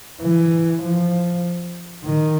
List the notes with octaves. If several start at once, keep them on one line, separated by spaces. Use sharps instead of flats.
E3
F3
D#3